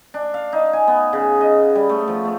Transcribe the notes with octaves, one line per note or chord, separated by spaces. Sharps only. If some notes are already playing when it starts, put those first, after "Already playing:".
D4
F5
D#4
G#5
B3
C#3
D#5
G3
A3
F3
A3